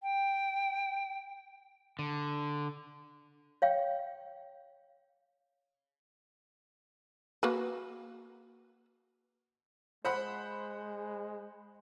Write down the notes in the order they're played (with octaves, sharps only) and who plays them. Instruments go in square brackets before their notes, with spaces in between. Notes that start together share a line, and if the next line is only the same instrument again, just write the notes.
[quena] G5
[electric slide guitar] D3
[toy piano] C#5 F5 G5
[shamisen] A#3 F#4 B4
[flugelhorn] G#3 [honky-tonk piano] C5 F#5 B5